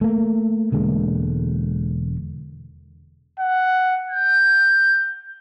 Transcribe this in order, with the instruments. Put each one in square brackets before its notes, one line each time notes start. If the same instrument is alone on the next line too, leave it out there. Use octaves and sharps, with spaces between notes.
[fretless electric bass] A3 A#3
E1 D3 G#3 A#3
[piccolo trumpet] F#5
G6